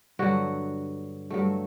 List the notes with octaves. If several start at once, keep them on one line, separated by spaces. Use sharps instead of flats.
G2 D3 F#3 F#4
G2 F#3 A3